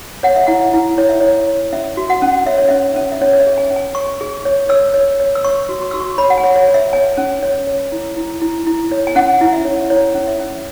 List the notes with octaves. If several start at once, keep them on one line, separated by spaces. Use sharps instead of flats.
C#5 F#5
E5
E4 F#5
E4
E4 C#5
E5
E4 C#5
C#5
C#4 E5
F#4
F#5
C#4
C#5 E5
C#5
C#4 E5
C#4
E5
C#4 C#5
C#5
E5
G#4
G#5
C#4
G#5
C#5 C#6
G#4
C#5
C#5 E6
C#5
C#5
E6
C#5 C#6
F#4
C#6
F#4 E6
C#6
C#5 B5
F#5
G#5
C#5
C#5
C#5
E5
C#5 G#5
C#4
C#5
C#5
E4
E4
E4
E4
C#5
G#5
C#4 F#5
E4
E5
C#5
E4 C#5
C#4
E5
C#4